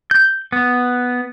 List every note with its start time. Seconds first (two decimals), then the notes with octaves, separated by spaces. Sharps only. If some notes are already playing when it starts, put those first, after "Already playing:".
0.11 G6
0.52 B3